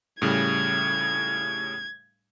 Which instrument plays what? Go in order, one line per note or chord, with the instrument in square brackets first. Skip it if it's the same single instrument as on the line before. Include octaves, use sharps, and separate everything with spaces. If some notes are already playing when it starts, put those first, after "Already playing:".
[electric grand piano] A2 C#3 G3 [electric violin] G#6